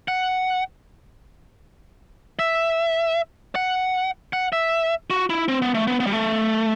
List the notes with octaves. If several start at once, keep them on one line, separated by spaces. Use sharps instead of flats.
F#5
E5
F#5
F#5
E5
F#4
E4
C4
B3
A3
B3
B3
G3
A3